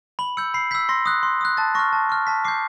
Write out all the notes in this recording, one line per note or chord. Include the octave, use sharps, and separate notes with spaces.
B5 F#7
E6 G6 C#7
B5 C7
E6 G6 B6
C6 A#6
D#6 F#6
C6
D#6 F#6
A5 A6
C#6 F6 A#6
A5
C#6 F6
A5 B6
D6 G6 C7